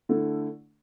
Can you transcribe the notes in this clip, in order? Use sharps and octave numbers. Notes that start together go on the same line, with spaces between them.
D3 A3 E4